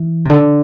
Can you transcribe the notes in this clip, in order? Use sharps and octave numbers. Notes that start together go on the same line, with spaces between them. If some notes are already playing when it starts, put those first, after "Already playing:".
Already playing: E3
C3
D3